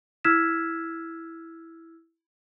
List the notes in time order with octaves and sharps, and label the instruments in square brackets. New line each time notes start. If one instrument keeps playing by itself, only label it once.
[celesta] E4 E6 F6 G#6 B6 E7